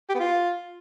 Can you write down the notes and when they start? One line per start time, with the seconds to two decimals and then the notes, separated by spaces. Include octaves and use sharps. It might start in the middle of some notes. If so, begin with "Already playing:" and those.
0.09 G4
0.15 B3
0.20 F4